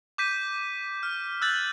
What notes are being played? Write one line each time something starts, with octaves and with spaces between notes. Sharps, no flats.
D6 G6 B6 D#7
F6
E6 F#6 G6 A6 F#7